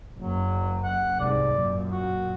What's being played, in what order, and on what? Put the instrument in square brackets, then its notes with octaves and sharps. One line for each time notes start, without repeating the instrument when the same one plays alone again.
[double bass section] F#1 [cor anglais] F#3
[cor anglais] F#5
[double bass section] C2 G#2 [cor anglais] D5
[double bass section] F#2 A#2
[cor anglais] F#4